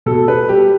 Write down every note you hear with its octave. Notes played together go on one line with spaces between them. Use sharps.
B2 A4
B4
G3 G4